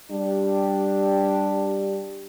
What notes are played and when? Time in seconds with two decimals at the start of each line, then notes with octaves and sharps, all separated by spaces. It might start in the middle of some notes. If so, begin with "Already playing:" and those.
0.11 G3 D4 G4